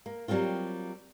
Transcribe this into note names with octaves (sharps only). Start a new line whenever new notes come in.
A#3
F#3 G3 A#3 C4 F4